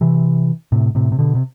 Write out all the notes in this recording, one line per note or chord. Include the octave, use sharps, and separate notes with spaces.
C3 E3
A2 C3
A2 C3
C3
B2 D3
C3